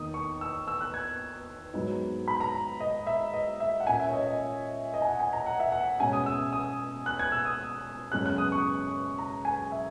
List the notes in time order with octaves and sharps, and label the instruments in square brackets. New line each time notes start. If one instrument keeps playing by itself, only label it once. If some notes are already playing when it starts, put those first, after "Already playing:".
Already playing: [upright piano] E2 D#3 A#3 D#4 D#6
C#6
E6
E6
F#6
G#6
G#2 F#3 B3 D#4
B5
A#5
D#5
E5
D#5
E5
F#5
A#2 A#3 C#4 G#5
E5
C#5
D#5
D#5
D#5
G#5
F#5
G#5
A#5
F#5
E5
F#5
B2 G#3 C#4 G#5
D#6
E6
D#6
F#6
G#6
E6
D#6
F#2 C#3 G#3 B3 F#6
F#6
D#6
C#6
A#5
G#5
E5